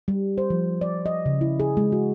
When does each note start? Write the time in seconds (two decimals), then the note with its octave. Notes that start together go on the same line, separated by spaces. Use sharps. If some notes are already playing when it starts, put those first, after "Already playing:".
0.08 G3
0.38 C5
0.50 F3
0.81 D5
1.06 D#5
1.26 C#3
1.41 E4
1.60 G#4
1.77 G#3
1.92 F#4